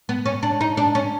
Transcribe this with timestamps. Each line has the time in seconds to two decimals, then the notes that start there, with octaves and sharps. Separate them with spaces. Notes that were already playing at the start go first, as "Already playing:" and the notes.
0.09 B3
0.26 C#4
0.43 D4
0.61 D#4
0.77 D4
0.95 C#4